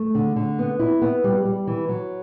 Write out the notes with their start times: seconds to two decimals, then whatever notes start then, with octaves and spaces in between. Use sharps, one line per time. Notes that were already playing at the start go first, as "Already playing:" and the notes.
Already playing: A3
0.15 D3
0.36 D3
0.59 B3
0.79 E4
1.02 B3
1.24 G3
1.45 G3
1.67 E3
1.89 F#3